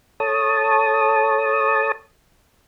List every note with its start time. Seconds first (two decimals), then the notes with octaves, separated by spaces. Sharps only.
0.20 A4 C#5 A5 D#6